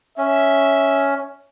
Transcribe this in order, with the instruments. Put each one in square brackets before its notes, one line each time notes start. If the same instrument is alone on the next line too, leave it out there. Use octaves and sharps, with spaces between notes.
[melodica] C#4 [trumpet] E5